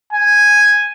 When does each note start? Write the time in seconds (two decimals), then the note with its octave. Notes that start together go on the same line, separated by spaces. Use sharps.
0.13 G#5